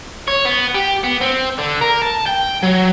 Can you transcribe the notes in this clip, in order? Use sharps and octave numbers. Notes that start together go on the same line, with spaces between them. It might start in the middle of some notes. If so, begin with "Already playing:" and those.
C#5
B3
G4
B3
C4
D3
A#4
A5
G5
F#3